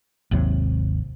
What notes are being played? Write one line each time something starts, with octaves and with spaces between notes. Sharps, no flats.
G#1 D#2 C3 F#3